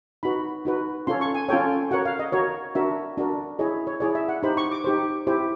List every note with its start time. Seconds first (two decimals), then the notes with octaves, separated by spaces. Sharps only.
0.23 D#4 F#4 B4 B5
0.65 D#4 F#4 B4
1.07 C#4 F4 A4 C#5 C6
1.21 C#6
1.35 G#5
1.48 C#4 F4 A4 C#5 G5
1.91 F#4 A#4 C#5 F#5
2.06 F5
2.19 D#5
2.32 F#4 A#4 C#5
2.75 D4 F#4 A#4 E5
3.18 D4 F#4 A#4
3.59 E4 G#4 C#5 D#5
3.87 C#5
4.00 E4 G#4 C#5 D5
4.15 E5
4.29 F#5
4.43 D#4 G4 C5 B5
4.57 C#6
4.71 D6
4.84 D#4 G4 C5
5.27 E4 G4 C5